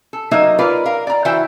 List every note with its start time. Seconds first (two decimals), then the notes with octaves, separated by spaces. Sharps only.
0.13 A4
0.31 F#3 A#3 D#4 D#5 E5
0.59 F4 A#4 B4 D5
0.86 A#4 F5
1.07 D5 A#5
1.25 E3 E4 F#4 C5 E5 G5